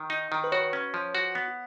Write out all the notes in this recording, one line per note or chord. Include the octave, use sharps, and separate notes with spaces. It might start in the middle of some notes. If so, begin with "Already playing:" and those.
Already playing: D#3
D#4
D#3
B4
F#4 C#5
C#4
F3
F#4 F#5
B3